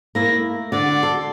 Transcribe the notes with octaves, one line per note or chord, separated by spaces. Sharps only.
A#3 E4 A#6
A3
D3 F#4 D5
F#4
A4 C6